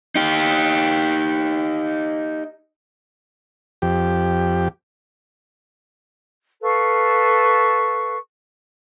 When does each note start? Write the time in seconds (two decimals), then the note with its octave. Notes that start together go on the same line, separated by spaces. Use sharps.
0.15 D#4 G4
3.82 F2 G4
6.61 A4 B4 F5 C#6